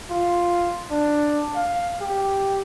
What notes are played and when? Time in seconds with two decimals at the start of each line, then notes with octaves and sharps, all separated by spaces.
0.11 F4
0.91 D4
1.56 F5
2.01 G4